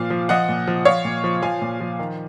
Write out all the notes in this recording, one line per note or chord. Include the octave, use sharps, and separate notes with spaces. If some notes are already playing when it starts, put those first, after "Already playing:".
Already playing: A#2 F3 F5
F3
F3 D#5 F#5
A#2
F3
F3 C#5 F5
A#2
F3
F3 F5 G#5
A#2
F3
D#3